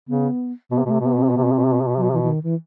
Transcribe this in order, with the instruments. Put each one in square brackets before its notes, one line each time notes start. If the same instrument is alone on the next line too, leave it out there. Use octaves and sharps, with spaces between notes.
[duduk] C#3 [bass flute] B3
[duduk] B2 [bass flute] B3
[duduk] C3
[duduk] B2 [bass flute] A3
[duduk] C3
B2
[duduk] C3 [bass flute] B3
[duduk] B2
[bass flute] C4
[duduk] C3
[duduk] B2 [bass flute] B3
[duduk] C3
[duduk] B2 [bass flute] C4
[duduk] C3
B2
C3
B2
C3
B2
[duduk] C3 [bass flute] F#3
[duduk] B2
[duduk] C3 [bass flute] E3
[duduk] B2
[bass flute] E3
D#3
E3